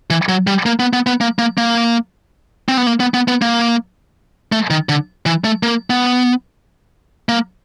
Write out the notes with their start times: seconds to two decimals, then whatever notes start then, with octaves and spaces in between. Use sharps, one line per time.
0.10 E3
0.29 F#3
0.47 G3
0.66 A#3
0.80 B3
0.93 B3
1.07 B3
1.21 A#3
1.39 A#3
1.58 A#3
2.69 C4
2.77 B3
2.87 A#3
3.00 B3
3.14 B3
3.28 B3
3.42 A#3
4.52 A3
4.70 D#3
4.89 D3
5.26 E3
5.44 A3
5.63 A#3
5.90 B3
7.29 A#3